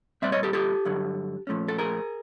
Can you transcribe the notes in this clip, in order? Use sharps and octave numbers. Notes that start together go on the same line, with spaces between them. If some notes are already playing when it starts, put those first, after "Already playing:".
A#2 G3 C4 D5 E5
C#5 D#5
G4 A4
G4 A4
G2 D3 F#3
A#2 F3 A3 C#4
A4
G#4 A#4